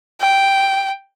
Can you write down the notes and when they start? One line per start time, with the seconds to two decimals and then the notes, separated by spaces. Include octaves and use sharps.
0.20 G5